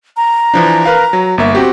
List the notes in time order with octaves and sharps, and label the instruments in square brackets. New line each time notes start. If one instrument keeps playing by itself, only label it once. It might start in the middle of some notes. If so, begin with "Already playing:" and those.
[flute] A#5
[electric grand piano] E3 F3 D4
A#4 B4 F5
F#3
G1 A#3 E5
C4 F#4 G4